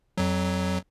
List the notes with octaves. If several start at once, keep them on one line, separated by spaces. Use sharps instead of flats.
F2 F#3